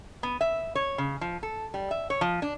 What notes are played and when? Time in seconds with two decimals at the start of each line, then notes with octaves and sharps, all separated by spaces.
0.23 B3
0.41 E5
0.75 C#5
0.98 C#3
1.21 F3
1.43 A4
1.74 G3
1.91 E5
2.10 C#5
2.21 F3
2.42 D4